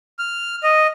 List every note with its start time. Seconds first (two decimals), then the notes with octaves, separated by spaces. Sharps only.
0.19 F6
0.63 D#5